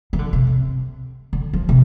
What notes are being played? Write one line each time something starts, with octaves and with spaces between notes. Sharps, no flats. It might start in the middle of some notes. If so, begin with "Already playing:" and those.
E3
D3
C3
C3
D3
F3
C3